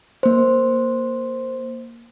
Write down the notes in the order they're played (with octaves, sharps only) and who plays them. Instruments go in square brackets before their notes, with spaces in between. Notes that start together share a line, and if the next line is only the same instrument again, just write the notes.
[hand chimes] A#3 C5